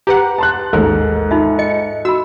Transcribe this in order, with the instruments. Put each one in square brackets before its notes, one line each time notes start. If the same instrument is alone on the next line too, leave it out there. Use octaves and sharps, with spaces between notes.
[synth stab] G4 B4 F#5 [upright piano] A#5
[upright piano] A5 C6 F#6
[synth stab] A1 D#2 A#4 [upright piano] G#2 A4
[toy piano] D#4 F4 E5
[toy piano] D#5 [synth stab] C#7
[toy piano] F#4 B5 [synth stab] E6